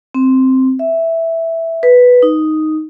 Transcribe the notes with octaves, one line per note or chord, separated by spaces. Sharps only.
C4
E5
B4
D#4